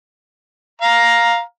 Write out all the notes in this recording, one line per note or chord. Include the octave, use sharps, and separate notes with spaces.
F5 A#5